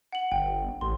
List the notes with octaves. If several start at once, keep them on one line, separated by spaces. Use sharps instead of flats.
F#5 F#7
G1 G5
A1 C6